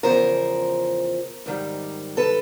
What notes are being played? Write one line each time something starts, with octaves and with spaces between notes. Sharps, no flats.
E2 C#3 F3 A#4 C5
G#2 D#3 G3
A4 B4